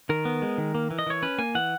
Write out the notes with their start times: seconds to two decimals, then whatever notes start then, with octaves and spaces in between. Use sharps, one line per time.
0.09 D#3 A#4
0.25 B3
0.42 G#3
0.58 D#3
0.75 A#3
0.91 E3
0.99 D#5
1.07 E3 C#5
1.23 C#4 B4
1.38 A#3 G#5
1.55 E3 F#5